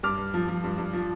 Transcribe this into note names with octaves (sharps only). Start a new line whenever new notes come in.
G2 D6 F6
G2
F3
F3
G2
G2
F3